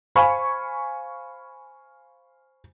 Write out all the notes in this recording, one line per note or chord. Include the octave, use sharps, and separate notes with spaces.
C5 F5 G#5 B5 C#6